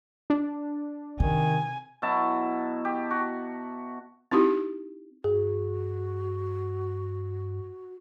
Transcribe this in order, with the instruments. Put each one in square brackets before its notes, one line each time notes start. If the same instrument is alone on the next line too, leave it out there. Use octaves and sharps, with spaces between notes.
[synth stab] D4
[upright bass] C3 [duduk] D#3 [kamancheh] G#5
[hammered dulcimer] B2 F#3 E4 A5
G4
F#4
[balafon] C4 D#4 E4 F#4 G4
[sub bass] G2 [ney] F#4 [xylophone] G#4